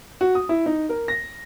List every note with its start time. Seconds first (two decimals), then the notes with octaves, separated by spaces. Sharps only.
0.21 F#4
0.35 D#6
0.49 E4
0.66 D#4
0.89 A#4
1.08 A#6